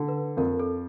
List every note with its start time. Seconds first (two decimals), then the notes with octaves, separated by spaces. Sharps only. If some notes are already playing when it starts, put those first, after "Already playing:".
Already playing: D3
0.08 B4
0.37 F2 A#4
0.60 A4